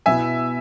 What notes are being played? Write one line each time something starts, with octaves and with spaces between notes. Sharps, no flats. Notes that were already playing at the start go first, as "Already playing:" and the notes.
B2 B3 E4 E5 G#5